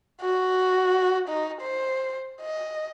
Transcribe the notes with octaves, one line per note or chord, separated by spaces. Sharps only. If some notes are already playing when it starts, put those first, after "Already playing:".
F#4
D#4
C5
D#5